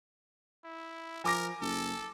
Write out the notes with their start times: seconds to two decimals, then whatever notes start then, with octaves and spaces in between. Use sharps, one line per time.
0.64 E4
1.24 F3 A#4 G#5 D6 A#6
1.61 F#1 A4